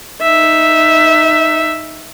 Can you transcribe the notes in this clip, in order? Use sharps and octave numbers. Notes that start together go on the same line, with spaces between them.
D#4 E5